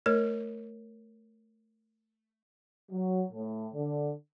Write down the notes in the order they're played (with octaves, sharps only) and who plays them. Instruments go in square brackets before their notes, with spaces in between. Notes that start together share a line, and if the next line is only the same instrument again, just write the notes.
[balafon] A3 A#4 C#5
[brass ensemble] F#3
A2
D3